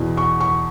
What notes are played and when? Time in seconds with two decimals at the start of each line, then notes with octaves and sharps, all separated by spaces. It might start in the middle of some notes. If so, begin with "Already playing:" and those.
Already playing: E2 B2
0.17 C#6
0.40 C#6